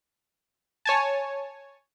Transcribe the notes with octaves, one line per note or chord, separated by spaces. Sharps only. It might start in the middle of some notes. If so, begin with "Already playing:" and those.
C#5 G#5 A5